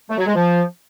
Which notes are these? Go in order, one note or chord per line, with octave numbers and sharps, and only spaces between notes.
A3
F#3
G#3
F3